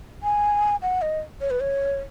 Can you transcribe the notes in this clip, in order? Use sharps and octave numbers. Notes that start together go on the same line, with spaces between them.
G#5
F#5
D#5
C#5
B4
C#5